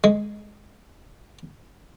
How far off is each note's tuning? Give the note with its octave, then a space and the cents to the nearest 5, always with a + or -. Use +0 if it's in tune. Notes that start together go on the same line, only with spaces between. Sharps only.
G#3 +5